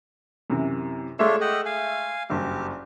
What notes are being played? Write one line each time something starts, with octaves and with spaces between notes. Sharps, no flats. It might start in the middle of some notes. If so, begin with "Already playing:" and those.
F#2 C3 E3
G#3 A3 D4 F4 C#5 E5
D#5 F#5 G5
F5 G#5
F#1 G2 G4